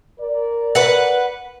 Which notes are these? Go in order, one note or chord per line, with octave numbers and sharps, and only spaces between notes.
A#4 D5
B4 F#5